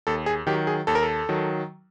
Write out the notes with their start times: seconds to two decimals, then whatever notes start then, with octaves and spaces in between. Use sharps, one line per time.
0.07 D#2 A4
0.26 G#4
0.47 D#3 F#3 G4
0.67 G#4
0.87 D#2 A4
0.95 A#4
1.03 A4
1.29 D#3 F#3